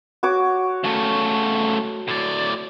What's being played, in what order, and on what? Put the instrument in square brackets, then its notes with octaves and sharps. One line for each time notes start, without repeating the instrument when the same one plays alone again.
[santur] F#4 C#5 D6
[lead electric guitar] C#3 A3
A2 D5